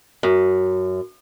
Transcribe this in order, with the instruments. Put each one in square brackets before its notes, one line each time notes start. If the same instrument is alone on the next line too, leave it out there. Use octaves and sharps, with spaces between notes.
[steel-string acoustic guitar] F#2